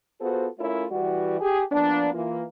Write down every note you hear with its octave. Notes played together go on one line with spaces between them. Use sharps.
B3 F4 F#4 G#4 A4 C5
A3 C#4 E4 F4 A#4 C#5
E3 G3 F#4
G4 G#4
F3 A#3 B3 D4
E3 A#3 F4